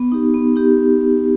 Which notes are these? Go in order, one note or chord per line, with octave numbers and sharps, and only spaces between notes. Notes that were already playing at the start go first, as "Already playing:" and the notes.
Already playing: B3
D#4 G4
B3
D#4 G4